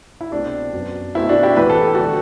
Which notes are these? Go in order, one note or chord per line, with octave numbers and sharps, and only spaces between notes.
E4
C2 B2 A3 C4 D4
F#2 F#3 B3
B2 A3 C4 E4
D4 F#4
E4 G4
A2 E3 B3 B4
A4
G4
D3 F#3 F#4 A4